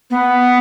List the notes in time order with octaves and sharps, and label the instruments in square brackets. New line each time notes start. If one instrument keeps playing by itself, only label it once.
[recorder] B3